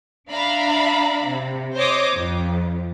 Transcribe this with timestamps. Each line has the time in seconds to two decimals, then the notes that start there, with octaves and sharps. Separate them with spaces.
0.30 D4 E5 F5 A#5 B5
1.27 C3
1.76 C5 C#5 D#5 D6 D#6
2.13 F2